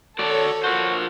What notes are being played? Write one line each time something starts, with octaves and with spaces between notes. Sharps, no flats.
F#4 A4 C#5 D5
F4 F#4 A#4 C5